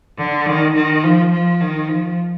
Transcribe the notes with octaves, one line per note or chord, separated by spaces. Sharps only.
D3
D#3
D#3
F3
F3
D#3
F3